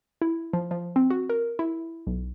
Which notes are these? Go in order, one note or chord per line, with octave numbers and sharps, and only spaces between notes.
E4
F3
F3
C4
F#4
A#4
E4
B1